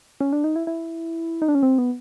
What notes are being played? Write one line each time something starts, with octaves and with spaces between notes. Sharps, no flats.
C#4
D4
D#4
E4
E4
D#4
D4
C#4
C4
B3